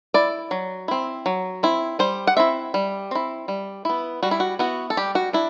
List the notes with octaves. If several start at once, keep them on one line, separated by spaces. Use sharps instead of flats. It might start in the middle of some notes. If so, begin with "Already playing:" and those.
E4 D5
F#3
C4 E4
F#3
C4 E4
G3 C5
F#5
C4 E4 E5
G3
C4 E4
G3
B3 E4
G3 F#4
E4
F#4
B3 E4 F#4
A4
G3 G4
F#4
D4 E4